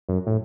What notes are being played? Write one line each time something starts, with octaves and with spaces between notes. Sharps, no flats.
F#2
A2